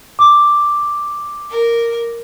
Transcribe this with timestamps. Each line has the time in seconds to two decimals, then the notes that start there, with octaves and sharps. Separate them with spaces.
0.19 D6
1.50 A#4